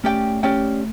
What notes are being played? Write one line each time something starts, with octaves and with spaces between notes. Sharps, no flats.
A3 C#4 G4 D5 G5
C#4 G4 D5 G5